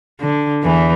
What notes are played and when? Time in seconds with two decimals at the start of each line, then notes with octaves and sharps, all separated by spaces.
0.20 D3
0.63 E2 E3